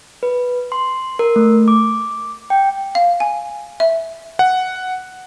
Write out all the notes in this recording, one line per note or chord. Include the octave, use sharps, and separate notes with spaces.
B4
C6
A#4
A3
D6
G5
F5
G#5
E5
F#5